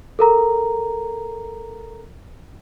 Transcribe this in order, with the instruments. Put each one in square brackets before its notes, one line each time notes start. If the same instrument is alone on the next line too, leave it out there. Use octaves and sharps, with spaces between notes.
[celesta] A4 A#4 A#5